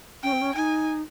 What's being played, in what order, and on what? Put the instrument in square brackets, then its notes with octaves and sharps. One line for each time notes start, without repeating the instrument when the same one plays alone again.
[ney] C#4 [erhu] G5
[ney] C4
C#4
[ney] D#4 [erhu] G#5